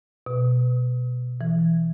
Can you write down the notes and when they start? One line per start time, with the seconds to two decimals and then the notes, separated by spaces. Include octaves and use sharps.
0.26 B2
1.41 E3